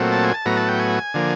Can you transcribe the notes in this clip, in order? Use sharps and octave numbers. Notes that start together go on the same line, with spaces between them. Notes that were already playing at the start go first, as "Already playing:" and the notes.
Already playing: A#2 F#3 A3 C4
A5
G#5
A5
A2 F#3 B3 A#5
A5
G5
G#5
D3 F3 A#3